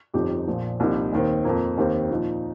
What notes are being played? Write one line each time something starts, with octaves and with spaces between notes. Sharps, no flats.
G1 F2 F3 D#4 G4
A#1 A#2 F3
C2 A#2 F3 D#4 G4
D#2 D#3 C4
F2 F3 A#3
D#2 D#3 C4 G4
A#2 F3 D#4